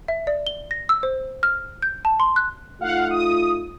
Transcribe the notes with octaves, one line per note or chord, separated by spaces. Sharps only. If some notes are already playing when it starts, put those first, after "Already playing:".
E5
D5
G7
A#6
E6
C5
F6
G6
A5
C6
F#6
A3 D#4 F4 F5 F#5
D#6